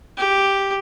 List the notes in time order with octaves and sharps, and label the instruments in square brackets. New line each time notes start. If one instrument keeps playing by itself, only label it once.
[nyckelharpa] G4